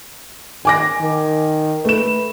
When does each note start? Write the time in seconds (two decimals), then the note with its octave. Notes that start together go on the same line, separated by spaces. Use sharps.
0.65 D#3 G#5 D6 A#6
1.01 D#3
1.85 A3 B4 E7